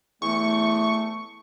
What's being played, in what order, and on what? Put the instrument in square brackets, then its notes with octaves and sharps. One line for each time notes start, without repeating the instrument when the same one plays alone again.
[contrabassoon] E2 [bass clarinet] A3 [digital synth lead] C#6